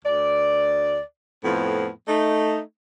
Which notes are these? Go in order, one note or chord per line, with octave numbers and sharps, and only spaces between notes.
D2 D5
F2 A2 F3 B3 C4
A3 D#4